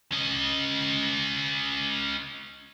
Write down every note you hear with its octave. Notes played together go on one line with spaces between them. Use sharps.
C#4 D#5